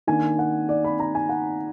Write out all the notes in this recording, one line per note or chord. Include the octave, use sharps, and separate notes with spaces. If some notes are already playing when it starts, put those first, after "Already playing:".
D#3 A#3 D4 G#5
F#5
D5
B5
A#5
G#5
F#5